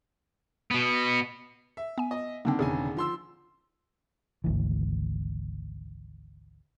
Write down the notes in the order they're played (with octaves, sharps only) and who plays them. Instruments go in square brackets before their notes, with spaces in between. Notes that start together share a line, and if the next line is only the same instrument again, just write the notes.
[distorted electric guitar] B2 B3
[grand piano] E5
[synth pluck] B3 G#5
[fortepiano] D#5
[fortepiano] D3 D#3 [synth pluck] A#3 C4
[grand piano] E1 C#3 G#5 [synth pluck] G#4
[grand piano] F3 C6 E6
[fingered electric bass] G#1 D2 E3